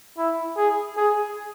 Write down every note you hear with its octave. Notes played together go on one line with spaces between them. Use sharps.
E4
G#4
G#4